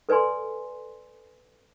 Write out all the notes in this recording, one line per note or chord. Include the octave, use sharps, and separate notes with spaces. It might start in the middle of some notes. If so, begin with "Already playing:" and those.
A4 B4 D5 G#5 C6